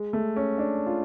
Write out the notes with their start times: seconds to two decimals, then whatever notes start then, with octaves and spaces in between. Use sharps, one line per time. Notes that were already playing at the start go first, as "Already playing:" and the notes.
Already playing: G#3
0.13 A3
0.36 C#4
0.58 D4
0.86 F4